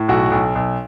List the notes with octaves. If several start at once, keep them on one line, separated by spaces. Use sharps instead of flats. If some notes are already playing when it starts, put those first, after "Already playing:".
Already playing: A2
B1 F#4
B1
B1